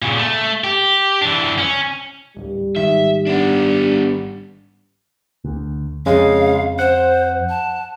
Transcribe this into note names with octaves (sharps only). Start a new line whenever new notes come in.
A#2 C#3
A3
G4
E3 D4
C#4
D1 G3
G#1 D#3 E5
B3 D4
D2
F2 C#3 G#3 F5
C5 F#5
A5